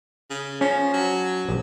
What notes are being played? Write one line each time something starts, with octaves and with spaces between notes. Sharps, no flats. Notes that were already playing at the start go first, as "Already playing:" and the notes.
C#3
F3 C#4
F#3
A#1